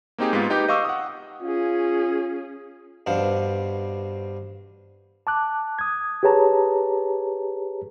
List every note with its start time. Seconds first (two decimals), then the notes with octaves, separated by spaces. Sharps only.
0.18 A#3 C4 D#4 G4 G#4
0.33 G#2 B3 F4
0.50 D#4 G4 B4 G6
0.68 D#5 F5 C#6 D6 E6
0.85 F#5 D#6
1.43 C#4 F4 G#4
3.06 G2 B2 D4 C5 F5
5.27 A5 D6 F#6
5.79 D#6 G#6
6.23 G4 G#4 B4 C#5 A5 A#5